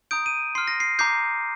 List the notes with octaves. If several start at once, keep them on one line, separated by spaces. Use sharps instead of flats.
A#5 D#6 G6 D7
D#7
C6 F6 C7
A#6
C7
A#5 D6 G6 C7